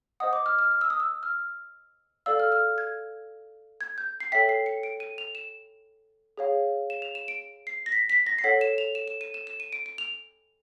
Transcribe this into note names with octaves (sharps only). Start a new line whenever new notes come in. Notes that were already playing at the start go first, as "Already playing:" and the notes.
C5 D#5 F#5 D#6
D6
F6
F6
F6
E6
D#6
E6
F6
A4 D5 F5 E6
F6
F6
G#6
G#6
G6
C7
A4 C#5 E5 G5 B6
C7
C#7
D7
D#7
F7
E7
G#4 C#5 F5
E7
F7
E7
D7
C7
A#6
B6
B6
A#6
C7
A4 C#5 F#5 B6
E7
F7
E7
E7
D#7
E7
E7
D#7
D7
D7
F7